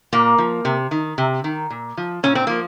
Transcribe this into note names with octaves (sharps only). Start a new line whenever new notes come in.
A#2 A#3
F3
C3
D#3
C3
D#3
A#2
F3
A#2 C#4
C4
F3 A#3